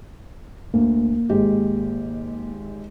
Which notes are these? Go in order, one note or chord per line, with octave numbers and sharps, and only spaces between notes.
D2 A#3
G#1 G#3 G4